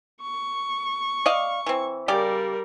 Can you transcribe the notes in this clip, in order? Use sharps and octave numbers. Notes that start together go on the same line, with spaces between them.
C#6
D5 D#5 F5
E3 C4
C#3 G3 G4 A#4 D5